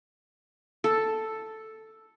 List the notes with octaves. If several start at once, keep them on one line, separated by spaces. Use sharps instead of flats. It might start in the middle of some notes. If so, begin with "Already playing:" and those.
A4